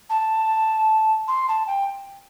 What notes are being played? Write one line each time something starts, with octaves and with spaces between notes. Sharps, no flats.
A5
C6
A5
G5